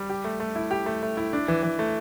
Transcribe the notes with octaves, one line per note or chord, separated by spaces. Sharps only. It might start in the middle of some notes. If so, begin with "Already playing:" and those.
Already playing: G3
G4
A3
A3
E4
G4
A3
A3
E4
D4
E3
E3
A3